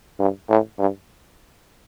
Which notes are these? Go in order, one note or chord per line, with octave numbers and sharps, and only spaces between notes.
G2
A2
G2